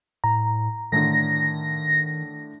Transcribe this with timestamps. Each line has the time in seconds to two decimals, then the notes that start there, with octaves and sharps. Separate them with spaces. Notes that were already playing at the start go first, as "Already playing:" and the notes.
0.24 A2 A#5
0.92 A2 D3 D#3 A#6